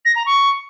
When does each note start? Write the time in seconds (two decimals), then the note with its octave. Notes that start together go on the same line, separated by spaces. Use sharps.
0.05 A#6
0.15 A#5
0.26 C#6